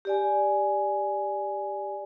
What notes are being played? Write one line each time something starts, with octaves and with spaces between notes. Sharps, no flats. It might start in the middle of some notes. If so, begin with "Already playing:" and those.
G4 D5 G#5